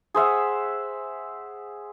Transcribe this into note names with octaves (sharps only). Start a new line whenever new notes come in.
G#4 C5 E5 F#5